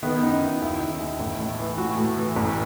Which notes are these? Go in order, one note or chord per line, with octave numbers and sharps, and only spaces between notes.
D#3 B3
F#2 D#4
F#2 E4
D#2 E4
D#3
D#2
A1
A2
E3
A2 F#4
A2
E3
A1